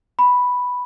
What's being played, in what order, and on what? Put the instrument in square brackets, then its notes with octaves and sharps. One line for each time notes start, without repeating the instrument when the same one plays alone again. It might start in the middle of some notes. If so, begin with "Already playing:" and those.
[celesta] B5